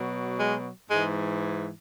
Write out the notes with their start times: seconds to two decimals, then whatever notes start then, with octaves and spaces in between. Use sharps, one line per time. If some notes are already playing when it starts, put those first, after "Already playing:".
Already playing: B2 F#3
0.39 G#3
0.88 G#2 E3 G#3